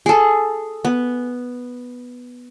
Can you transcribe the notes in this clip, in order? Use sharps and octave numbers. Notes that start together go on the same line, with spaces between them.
G#4 A4
B3